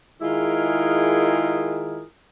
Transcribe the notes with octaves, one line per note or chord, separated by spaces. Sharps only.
D#3 G#3 E4 F4 G#4 A#4